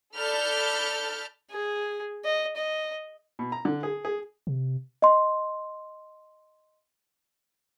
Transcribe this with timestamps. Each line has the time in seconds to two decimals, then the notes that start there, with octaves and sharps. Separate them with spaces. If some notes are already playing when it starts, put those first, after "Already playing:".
0.17 A4 D5 A5 B5 F6 G6
1.51 G#4
2.25 D#5
2.57 D#5
3.39 B2
3.52 A#5
3.65 D3
3.83 G#4
4.05 G#4
4.47 C3
5.02 D#5 C6